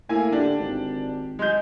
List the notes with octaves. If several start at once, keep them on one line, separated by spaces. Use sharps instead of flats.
A2 A#3 E4 G#5
D3 D4 G4
G#1
G#3 G6